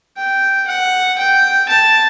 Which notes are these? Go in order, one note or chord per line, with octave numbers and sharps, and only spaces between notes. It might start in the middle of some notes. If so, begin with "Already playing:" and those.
G5
F#5
G5
A5